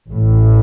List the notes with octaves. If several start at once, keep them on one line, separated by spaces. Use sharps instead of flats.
A1 A2